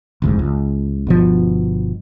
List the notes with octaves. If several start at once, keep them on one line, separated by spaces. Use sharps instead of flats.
F1 D2 G#2
C#2
G1 B2 F3